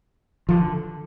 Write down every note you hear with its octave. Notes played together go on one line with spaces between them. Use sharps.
D3 F3